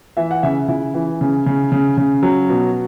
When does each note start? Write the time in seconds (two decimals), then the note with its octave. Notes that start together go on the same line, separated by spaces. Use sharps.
0.17 E3 E5
0.31 F#5
0.43 C#3 E5
0.68 C#3 E4
0.94 E3
1.21 C#3
1.46 C#3
1.72 C#3
1.97 C#3
2.23 F#3
2.50 B2